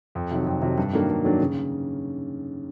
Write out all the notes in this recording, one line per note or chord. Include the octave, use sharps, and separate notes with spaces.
F2
C3 D#3 F#3
F2
C3 D#3 F#3
G2
D#3 F#3 A#3 D4
G2
D#3 F#3 A#3 D4
C#3